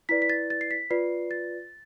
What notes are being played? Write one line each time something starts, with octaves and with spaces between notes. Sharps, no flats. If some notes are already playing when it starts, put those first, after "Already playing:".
E4 B4 D5 B6
B6
A6
A6
C7
B6
F4 B4 D5 C7
A6